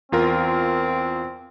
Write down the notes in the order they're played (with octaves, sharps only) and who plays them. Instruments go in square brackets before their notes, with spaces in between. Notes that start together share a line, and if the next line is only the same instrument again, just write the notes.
[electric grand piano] E2 F4 A#4 [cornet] C4